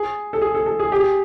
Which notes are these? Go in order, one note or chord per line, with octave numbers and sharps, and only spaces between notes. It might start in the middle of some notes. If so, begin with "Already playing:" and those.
Already playing: G#4
A4
G#4
A4
A4
G#4
G4
G#4